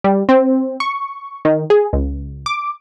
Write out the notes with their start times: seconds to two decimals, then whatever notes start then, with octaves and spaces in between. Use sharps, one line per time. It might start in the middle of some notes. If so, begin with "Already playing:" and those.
0.04 G3
0.29 C4
0.80 C#6
1.45 D#3
1.70 G#4
1.93 C#2
2.46 D6